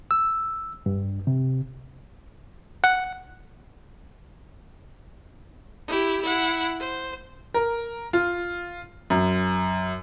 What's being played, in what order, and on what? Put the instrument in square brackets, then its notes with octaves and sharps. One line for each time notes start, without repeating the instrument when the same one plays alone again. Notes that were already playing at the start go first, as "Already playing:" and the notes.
[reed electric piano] E6
G2
C3
[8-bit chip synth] F#5
[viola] E4 G4
E4 F#5
C5
[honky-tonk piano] A#4
F4
F#2